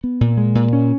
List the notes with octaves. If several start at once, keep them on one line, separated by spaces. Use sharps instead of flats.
B3
A#2
G#3
A#2
C#4